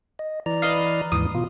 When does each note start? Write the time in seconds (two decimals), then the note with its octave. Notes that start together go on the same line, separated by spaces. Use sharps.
0.19 D#5
0.46 E3 D5 A#5
0.62 B4 D#5 F5
1.12 D#2 G#2 E3 D#6
1.35 B2 F4